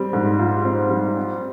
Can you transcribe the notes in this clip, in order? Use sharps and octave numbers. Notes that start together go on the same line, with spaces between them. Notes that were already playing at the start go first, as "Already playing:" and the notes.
Already playing: G3 C4
G#2
F4
C4
G3
C4